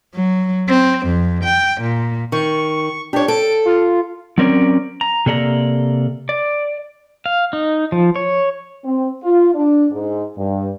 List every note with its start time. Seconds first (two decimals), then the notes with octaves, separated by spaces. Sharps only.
0.14 F#3
0.68 C4
1.06 F2
1.43 G5
1.79 A#2
2.32 D#3 C#6
3.13 D4 G4 C#5
3.28 A4 D7
3.65 F4
4.38 F#3 C4 C#4 A#4 D5
5.01 A#5
5.26 C3 A#3 A4 D5 G#5 A#5
6.29 D5
7.26 F5
7.53 D#4
7.92 F3
8.16 C#5
8.85 C4
9.24 F4
9.55 D4
9.92 G#2
10.37 G2